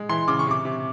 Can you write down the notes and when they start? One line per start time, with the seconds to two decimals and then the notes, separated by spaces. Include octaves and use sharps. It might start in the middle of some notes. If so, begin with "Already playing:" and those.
Already playing: G#3
0.09 E3 C6
0.28 C#3 D6
0.39 C#6
0.46 C3 D6
0.65 C3